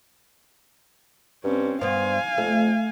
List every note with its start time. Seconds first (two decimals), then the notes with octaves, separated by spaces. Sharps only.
1.44 G2 C4 C#4
1.81 G2 B3 C5 F5 G#5
2.38 F2 A3